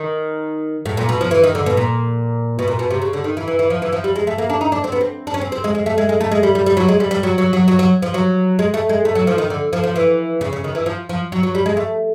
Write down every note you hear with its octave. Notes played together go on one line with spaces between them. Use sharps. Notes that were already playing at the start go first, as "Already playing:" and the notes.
Already playing: D#3
A2
A#2
B2
F3
E3
D#3
D3
B2
A#2
B2
A#2
B2
C3
C#3
D3
D#3
E3
E3
E3
F3
E3
F3
G3
G#3
A3
A#3
D4
D#4
D4
C4
B3
C4
D4
C#4
C4
C4
G#3
G#3
A3
G#3
G#3
A3
G#3
G3
G3
G3
F#3
G#3
G3
G3
F#3
F#3
F#3
F#3
F#3
F3
F#3
G#3
A3
G#3
A3
F#3
F3
D#3
D3
F3
F3
E3
C#3
C#3
D#3
E3
F3
F3
F#3
F#3
G3
G#3
A3